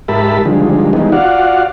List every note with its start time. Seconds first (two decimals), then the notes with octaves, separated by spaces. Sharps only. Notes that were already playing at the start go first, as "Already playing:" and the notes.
0.08 G#2 G4 A#4 E5 A5 B5
0.45 D3 D#3 F3 G3 G#3
0.93 D#3 E3 G3 G#3 B3 D#4
1.12 F4 F#4 D5 F5 F#5